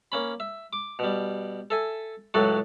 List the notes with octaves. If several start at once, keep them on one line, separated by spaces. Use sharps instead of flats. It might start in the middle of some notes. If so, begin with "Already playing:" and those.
A#3 C#4 B5
E5
D6
B2 G3
A4 E5 G#5
C#2 A2 F#3 F#4 A4